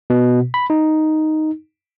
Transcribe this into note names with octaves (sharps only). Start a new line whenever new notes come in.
B2
B5
D#4